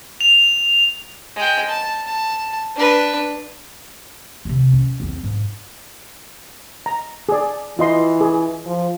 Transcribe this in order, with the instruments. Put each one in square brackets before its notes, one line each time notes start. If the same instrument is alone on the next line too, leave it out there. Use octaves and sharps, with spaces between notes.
[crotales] F7
[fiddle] G#3 G5
A5
A5
D4 B4
[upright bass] D#2 C3
C#4
E2 C4
G#2
[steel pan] A#5
G#4 D5
[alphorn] E3 [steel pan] F4 D#5 C6
[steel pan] G#4
[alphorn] F3